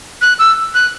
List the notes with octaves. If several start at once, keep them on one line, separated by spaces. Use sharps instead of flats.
F#6
E6
F#6